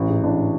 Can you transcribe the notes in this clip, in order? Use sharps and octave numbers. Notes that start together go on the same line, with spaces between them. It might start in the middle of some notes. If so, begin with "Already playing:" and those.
Already playing: A1
G#2
A1 D4